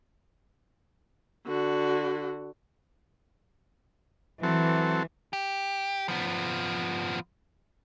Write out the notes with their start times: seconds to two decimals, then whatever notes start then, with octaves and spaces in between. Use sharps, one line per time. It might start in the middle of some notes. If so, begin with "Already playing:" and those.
1.47 D3 F#4
4.43 E3 F#3 C4 A4
5.33 G4
6.08 F3 B3